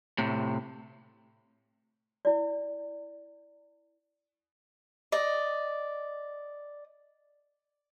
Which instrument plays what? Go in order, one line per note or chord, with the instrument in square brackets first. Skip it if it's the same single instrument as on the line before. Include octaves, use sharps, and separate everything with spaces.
[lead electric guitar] A2 C3
[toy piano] E4 D5
[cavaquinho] D5 D#5